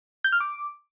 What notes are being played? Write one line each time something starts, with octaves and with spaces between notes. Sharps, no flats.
G6
F6
D6